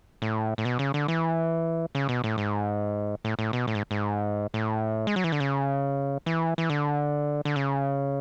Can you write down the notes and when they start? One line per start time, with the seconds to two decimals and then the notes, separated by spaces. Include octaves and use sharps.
0.22 A2
0.58 A2
0.65 B2
0.79 C#3
0.94 D3
1.08 E3
1.95 C#3
2.09 B2
2.24 A2
2.38 G#2
3.25 A2
3.39 A2
3.53 B2
3.67 A2
3.75 G#2
3.91 G#2
4.54 A2
5.07 G#3
5.16 F#3
5.24 E3
5.32 D3
5.40 C#3
6.26 E3
6.58 E3
6.70 D3
7.45 D3
7.56 C#3